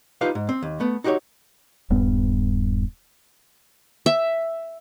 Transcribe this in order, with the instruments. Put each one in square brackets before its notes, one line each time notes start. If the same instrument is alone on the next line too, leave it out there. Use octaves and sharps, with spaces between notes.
[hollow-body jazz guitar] D#4 F4 G4 B4 F5
G#2
C4
D#2
A3 B3
D#4 F#4 G4 C5 C#5
[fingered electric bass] D#1 G2 B3
[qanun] E5